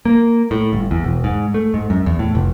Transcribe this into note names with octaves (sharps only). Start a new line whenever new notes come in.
A#3
A2
G1
E2
E1
G#2
A3
G#2
F#2
E2
A2
F1